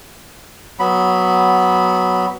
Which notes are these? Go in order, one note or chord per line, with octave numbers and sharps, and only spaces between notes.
F#3 B3 B5